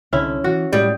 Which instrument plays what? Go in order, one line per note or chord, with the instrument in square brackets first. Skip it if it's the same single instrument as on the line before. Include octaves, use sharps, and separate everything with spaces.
[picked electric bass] C2 D3 [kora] C#4 E4
[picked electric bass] E3 [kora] F#4
[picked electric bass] A2 G#3 [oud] G3